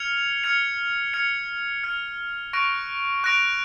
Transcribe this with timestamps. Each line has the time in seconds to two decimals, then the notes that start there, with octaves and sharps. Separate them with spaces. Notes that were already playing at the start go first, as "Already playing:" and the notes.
Already playing: F6 G#6 C#7 F7
0.43 F6 G#6 C#7 F7
1.13 F6 G#6 C#7 F7
1.84 F6 G#6 C#7 F7
2.53 C#6 F#6 A#6 D7 F7
3.24 C#6 F#6 A#6 D7 F7